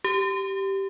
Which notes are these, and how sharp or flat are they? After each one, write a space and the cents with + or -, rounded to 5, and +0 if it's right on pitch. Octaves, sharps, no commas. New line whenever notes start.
G4 -10